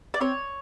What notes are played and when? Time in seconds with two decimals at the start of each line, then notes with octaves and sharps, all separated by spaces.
0.14 D5
0.20 C4 C#5